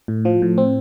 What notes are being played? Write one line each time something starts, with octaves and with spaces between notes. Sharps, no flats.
A2
F3
A2
C4